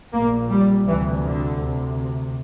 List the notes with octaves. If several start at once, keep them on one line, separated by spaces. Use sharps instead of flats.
A#1 A#2 A#3
G3
D2 C3 E3
D3
D2 C3